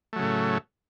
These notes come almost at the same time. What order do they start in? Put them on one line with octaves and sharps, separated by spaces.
A3 F#3 C#3 A2